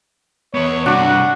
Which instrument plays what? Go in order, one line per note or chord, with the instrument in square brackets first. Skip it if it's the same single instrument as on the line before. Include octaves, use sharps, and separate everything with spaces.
[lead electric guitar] E2 B3 [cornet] C#5
[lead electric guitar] G2 C3 [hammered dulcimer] D4 [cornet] F#4